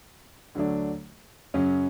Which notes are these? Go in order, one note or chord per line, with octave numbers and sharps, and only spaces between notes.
D2 D3 F#3 A3 D4
F#2 C#3 F#3 C#4